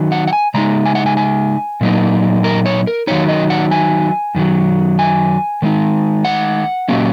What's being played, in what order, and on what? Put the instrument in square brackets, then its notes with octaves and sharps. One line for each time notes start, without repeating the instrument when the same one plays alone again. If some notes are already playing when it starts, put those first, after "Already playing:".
Already playing: [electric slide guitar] D#3 F#3 D#4
F#5
F#5
G#5
C#3 G#3 D#4 A#5
G#5
F#5
G#5
G#5
A#2 F#3 A#3 D#4
A#4
C#5
A#4
D#3 F#3 D#4 C#5
D#5
F#5
G#5
F#2 D#3 F#3
G#5
D#3 G#3 D#4
F#5
A#2 F#3 A#3 C#4